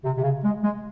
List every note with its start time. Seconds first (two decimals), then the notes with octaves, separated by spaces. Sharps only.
0.04 C3
0.17 C3
0.23 C#3
0.43 G#3
0.63 G#3